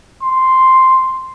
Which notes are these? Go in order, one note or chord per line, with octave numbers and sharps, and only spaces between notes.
C6